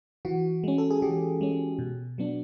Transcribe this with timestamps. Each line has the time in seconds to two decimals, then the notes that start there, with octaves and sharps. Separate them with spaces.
0.25 E3 F#4
0.64 G#3 C#4
0.78 A4
0.90 G#4
1.02 E3 G4
1.41 G#3 C#4
1.79 B2
2.18 F#3 B3 D4